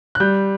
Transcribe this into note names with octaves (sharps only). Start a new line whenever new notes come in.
F#6
G3 G6